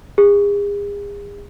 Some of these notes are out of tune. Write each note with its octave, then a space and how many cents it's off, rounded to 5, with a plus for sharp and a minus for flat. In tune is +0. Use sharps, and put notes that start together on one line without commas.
G#4 -40